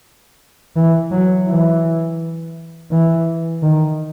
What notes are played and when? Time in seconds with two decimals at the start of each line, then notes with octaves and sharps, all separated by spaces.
0.76 E3
1.11 F#3
1.48 E3
2.91 E3
3.62 D#3